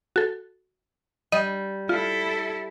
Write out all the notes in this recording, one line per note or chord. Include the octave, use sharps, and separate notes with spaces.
F#4 A4
G3 D#5
E4 F4 A4